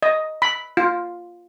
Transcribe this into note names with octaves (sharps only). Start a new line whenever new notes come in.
D#5
B5
F4